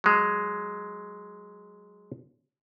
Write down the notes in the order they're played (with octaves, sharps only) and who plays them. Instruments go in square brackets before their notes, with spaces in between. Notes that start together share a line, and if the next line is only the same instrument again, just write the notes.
[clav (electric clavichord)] F#3 G#3